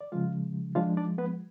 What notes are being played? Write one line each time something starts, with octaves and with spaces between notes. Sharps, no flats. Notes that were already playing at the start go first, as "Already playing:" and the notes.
D5
C#3 F3 G#3 F4 F5
F3 G#3 D4 F4 F5
D4 D5
B3 B4